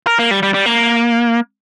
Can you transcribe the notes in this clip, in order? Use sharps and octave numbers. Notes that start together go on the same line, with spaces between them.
A#4
A#3
G3
G3
G3
A#3